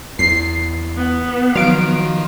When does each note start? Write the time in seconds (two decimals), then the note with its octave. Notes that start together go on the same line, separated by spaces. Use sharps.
0.19 E2 C7
0.96 B3
1.55 D#3 F3 F#3 F5 D7